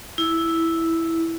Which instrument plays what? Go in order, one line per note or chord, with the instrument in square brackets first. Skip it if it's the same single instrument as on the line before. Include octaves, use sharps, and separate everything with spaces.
[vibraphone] E4